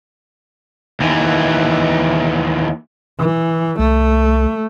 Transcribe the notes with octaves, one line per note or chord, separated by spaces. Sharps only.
D#2 E3
E3
C2 A3